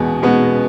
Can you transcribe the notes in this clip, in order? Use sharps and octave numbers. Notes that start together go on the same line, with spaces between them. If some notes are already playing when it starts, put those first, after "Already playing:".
Already playing: E2 B2 G#3 B3
B2 G#3 B3